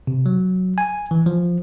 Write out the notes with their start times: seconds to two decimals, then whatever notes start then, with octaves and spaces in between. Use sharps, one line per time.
0.07 C3
0.26 F#3
0.78 G#5
1.11 E3
1.26 F3